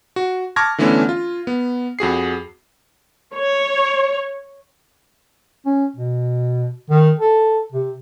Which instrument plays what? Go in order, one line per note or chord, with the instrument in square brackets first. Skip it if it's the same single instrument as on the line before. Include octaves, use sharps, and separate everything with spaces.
[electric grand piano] F#4
A5 C#6 D6 F6 G#6 A#6
D3 E3 A3 B3 C#4 D4
F4
B3
F2 F#4 G#4 C7
[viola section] C#5
[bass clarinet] C#4
B2
D#3
A4
C3